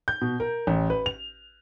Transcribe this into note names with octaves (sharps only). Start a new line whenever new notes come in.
G6
B2
A#4
A1
B4
F7